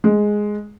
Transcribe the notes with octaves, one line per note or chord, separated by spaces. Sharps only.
G#3